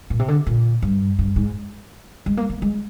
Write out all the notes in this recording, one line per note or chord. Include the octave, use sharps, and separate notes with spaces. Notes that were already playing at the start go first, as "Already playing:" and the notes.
A#2
C3
D3
A#2
G2
G2
G#2
G#3
A#3
A#3
G#3